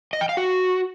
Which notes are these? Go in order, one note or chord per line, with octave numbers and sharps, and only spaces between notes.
D#5
G5
F5
F#4